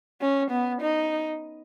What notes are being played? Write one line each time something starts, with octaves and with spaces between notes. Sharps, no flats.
C#4
B3
D#4